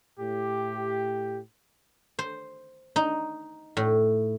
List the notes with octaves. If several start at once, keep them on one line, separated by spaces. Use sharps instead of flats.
A2 G4
C5
D#4
A2